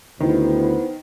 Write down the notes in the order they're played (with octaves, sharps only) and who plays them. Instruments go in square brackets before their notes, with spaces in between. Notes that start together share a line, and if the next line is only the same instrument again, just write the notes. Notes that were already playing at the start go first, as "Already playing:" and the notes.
[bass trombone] D2 [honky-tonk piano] D#3 [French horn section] B3 C5 [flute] E4